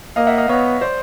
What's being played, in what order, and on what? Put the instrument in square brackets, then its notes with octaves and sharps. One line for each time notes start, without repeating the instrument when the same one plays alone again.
[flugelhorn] A#3 [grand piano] D#5 F5
[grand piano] E5 F#5
D#5 F5
[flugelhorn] B3 [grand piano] C#5 D#5
[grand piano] C5 D5